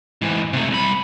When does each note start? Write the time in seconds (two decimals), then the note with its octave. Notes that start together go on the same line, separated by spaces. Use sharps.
0.22 G#2 E3
0.53 C3 A3
0.70 C2 B5